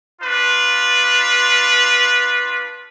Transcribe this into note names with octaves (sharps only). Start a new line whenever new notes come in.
D4 F4 B4